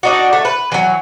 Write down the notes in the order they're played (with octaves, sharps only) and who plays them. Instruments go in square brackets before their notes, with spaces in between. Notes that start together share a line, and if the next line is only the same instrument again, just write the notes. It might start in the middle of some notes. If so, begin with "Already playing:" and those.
[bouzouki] D4 D#4 F#4
A3
B4
E3 F#3